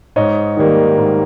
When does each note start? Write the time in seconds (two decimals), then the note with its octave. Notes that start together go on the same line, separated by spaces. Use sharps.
0.16 G#2 C#5 D#5
0.57 D#3 G3 A#3
0.98 G#2